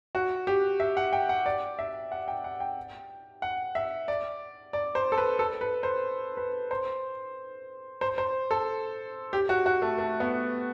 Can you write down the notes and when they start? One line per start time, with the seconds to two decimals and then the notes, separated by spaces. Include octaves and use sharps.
0.15 F#4
0.47 G4
0.80 E5
0.97 F#5
1.13 G5
1.29 F#5
1.46 D5
1.79 E5
2.12 F#5
2.28 G5
2.44 F#5
2.60 G5
3.42 F#5
3.75 E5
4.08 D5
4.73 D5
4.95 C5
5.12 A4
5.18 B4
5.39 A4
5.61 B4
5.83 C5
6.37 B4
6.71 C5
8.01 C5
8.18 C5
8.51 A4
9.33 G4
9.49 F#4
9.66 F#4
9.82 A3
9.98 A3
10.20 B3